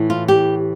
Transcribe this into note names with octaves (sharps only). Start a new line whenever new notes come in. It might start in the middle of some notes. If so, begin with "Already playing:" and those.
Already playing: A2 E3
F4
G4